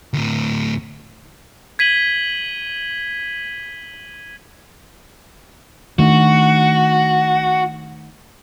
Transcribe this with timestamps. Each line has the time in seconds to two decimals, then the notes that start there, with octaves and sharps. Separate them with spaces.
0.14 D2 A2
1.79 G#6 B6 D#7 F#7 G7
5.99 D#3 A3 D4 F#4